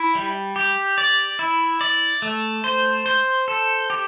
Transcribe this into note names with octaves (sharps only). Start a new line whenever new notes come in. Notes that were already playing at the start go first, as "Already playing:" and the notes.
Already playing: E4
G3
G4
D5
E4
D5
A3
C5
C5
A4
G4